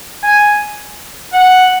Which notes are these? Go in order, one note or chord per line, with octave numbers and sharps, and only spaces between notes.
G#5
F#5